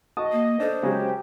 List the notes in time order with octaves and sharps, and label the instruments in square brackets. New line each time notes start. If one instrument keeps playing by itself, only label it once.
[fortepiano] F#4 A5 D#6 [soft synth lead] D#5
[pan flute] A#3
[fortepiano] D4 A4 [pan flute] C5
[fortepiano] C#3 F#3 G#3 [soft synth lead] G4